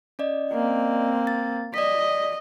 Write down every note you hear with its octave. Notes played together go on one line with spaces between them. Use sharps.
C#4 D5 D#5
A#3 C4
A6
D5 D#5 B6